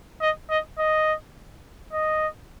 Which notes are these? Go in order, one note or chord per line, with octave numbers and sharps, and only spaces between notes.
D#5
D#5
D#5
D#5